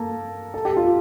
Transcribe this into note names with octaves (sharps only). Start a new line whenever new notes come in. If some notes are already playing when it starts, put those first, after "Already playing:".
Already playing: A#3 A4 A#4
A4
G4
F4